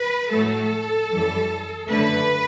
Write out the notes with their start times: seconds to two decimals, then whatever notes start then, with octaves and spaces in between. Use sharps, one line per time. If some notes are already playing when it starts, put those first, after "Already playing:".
Already playing: B4
0.31 A2 F#3 A3 A4
1.10 F#2 E3 G3
1.88 F#2 D3 A3 B4